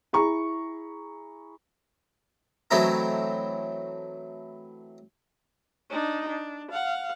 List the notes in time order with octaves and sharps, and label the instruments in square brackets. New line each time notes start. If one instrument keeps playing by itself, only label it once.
[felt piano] E4 G#4 A#5 C#6
[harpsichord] E3 F#3 A3 C4 D#4 E4
[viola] D4 D#4
D4
F5 F#5